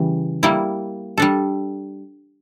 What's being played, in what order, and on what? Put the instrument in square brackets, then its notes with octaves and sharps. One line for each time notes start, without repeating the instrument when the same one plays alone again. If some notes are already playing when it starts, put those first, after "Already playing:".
Already playing: [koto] C#3 E3 G3
G3 A#3 E4
G3 D4 A4